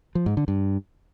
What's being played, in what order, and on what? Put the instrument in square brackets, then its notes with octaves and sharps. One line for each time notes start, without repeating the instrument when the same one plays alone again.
[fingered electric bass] F3
G#2
D3
G2